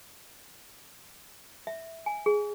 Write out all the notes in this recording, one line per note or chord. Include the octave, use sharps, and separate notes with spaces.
E5
G#5
G#4